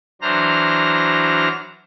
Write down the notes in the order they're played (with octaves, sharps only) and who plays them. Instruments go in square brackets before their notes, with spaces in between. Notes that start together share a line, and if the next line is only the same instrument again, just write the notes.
[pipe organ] E3 F#3 D4 C5 A#5 F6